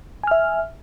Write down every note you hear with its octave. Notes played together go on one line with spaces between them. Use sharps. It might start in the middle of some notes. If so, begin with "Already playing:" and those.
E5 G#5 F6